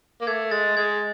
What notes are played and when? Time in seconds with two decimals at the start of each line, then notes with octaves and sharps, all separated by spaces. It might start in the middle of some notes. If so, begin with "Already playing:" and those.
0.21 A#3
0.27 A3 G#6
0.51 G#3 A6
0.77 G#3 G#6